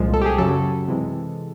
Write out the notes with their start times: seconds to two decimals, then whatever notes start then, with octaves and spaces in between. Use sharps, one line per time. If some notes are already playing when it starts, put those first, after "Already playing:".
Already playing: C2 A#2 F3 G#3
0.14 A4
0.21 G4
0.26 G#4
0.38 F#2 C#3 F#3 A4
0.88 C3 E3 G#3